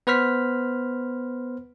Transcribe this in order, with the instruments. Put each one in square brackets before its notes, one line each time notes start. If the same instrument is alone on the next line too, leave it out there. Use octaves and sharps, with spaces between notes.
[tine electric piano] B3 B4 C5 F6 B6